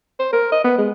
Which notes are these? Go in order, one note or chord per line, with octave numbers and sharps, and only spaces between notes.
C5
A#4
D#5
B3
G#3